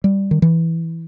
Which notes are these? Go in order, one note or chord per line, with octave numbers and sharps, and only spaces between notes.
G3
D#3
E3